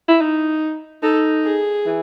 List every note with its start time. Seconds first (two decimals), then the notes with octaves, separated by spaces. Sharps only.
0.08 E4
0.21 D#4
1.03 D#4 A4
1.44 G#4
1.86 E3